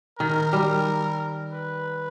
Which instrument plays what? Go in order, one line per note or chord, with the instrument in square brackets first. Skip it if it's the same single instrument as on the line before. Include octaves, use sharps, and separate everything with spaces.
[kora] D#3 [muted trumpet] A#4
[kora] G3
[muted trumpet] B4